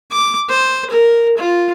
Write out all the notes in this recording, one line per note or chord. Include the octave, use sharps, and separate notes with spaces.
D6
C5
A#4
F4